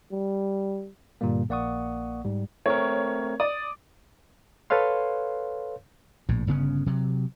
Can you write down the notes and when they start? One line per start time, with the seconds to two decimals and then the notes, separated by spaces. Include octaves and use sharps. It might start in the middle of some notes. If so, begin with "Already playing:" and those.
0.12 G3
1.21 G2 A#2 D3 G3 A#3
1.49 A#1 A#3 D5 F#5 C#6 D#6
2.24 G#2 G3
2.66 A3 C4 A#4 C#5
3.40 D5 D#6
4.70 A4 B4 C#5 F5 C6
6.29 A#1 A2
6.47 G1 C#3 B3 C#4
6.86 C3 F#3